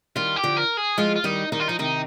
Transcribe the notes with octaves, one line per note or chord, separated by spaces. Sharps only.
D#3 G3 F4
G4
D3 F3
A#4
G#4
F3 G#3 F4
F4
D#3 G3 D#4
D#3 G3 D#4
F4
F3 D#4
C3 D#3 D#4